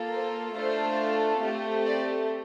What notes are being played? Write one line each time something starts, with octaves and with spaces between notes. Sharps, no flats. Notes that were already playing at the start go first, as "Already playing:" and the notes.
Already playing: A#3 F4 A4
C5
A3 D4 F4 A4 C5
A3 C4 G4
D5